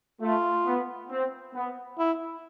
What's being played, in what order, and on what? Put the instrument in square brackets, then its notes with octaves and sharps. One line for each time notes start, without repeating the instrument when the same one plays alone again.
[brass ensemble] A3 [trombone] F4
[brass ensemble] B3
C4
B3
[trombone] E4